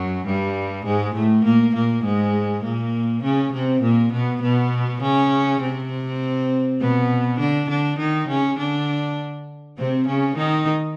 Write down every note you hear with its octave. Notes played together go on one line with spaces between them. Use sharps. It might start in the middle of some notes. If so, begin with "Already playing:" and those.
Already playing: F#2 F#3
G2 G3
G#2 G#3
A2 A3
A#2 A#3
A#2 A#3
G#2 G#3
A#2 A#3
C#3 C#4
C3 C4
A#2 A#3
B2 B3
B2 B3
C#3 C#4
C3 C4
B2 B3
D3 D4
D3 D4
D#3 D#4
C#3 C#4
D3 D4
C3 C4
C#3 C#4
D#3 D#4